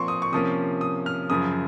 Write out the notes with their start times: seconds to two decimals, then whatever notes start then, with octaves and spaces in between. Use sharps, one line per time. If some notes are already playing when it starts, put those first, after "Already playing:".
Already playing: A#2 F3 C4 C6 C#6
0.08 D#6
0.22 C#6
0.32 C3 F3 A#3 C#4 D#6
0.81 D#6
1.06 F6
1.30 F#2 C#3 F3 D#6